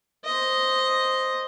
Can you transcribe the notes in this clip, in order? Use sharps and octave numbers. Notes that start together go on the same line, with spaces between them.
C5 D#5